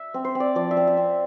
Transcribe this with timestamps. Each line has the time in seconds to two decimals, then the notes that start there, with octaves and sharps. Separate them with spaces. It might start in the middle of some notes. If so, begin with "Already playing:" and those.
Already playing: E5
0.14 C4
0.25 C5
0.35 C4
0.40 D5
0.55 F3 D5
0.71 E5
0.77 C4
0.87 E5
0.97 C4